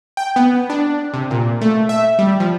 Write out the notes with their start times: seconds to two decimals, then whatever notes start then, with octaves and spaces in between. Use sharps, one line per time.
0.17 G5
0.36 B3
0.70 D4
1.14 C3
1.31 A#2
1.61 A3
1.89 E5
2.19 G3
2.40 F3